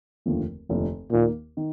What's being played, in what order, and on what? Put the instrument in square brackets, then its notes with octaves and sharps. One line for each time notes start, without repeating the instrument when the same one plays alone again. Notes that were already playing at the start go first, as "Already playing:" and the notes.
[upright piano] F1 D#2 D3 F3 A3
F1 D#2 D3 F3 A3
[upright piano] D#2 D#3 A#3 [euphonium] A#2
[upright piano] D#3